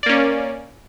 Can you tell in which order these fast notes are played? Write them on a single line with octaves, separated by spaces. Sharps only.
D5 A#3 C#4